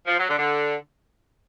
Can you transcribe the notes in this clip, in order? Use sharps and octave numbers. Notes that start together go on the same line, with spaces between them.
F3
F#3
D3
D3